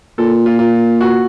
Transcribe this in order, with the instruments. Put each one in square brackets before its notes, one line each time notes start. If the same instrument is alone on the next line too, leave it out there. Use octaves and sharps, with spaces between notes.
[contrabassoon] A#2 [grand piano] A4
[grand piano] F4
F4
F#4